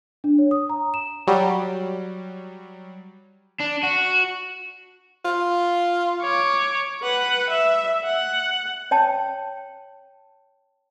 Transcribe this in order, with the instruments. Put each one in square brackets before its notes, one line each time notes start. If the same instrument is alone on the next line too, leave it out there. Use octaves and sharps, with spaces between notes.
[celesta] D4
C#5
D#6
A#5
E7
[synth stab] F#3 G3
[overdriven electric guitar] D4
F#4
[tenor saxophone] F4
[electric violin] C#5 D6
[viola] B4 F#5
E5
F#5
[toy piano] C#5 G5 A5